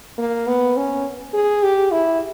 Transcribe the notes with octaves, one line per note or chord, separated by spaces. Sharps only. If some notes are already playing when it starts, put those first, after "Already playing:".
A#3
B3
C#4
G#4
G4
E4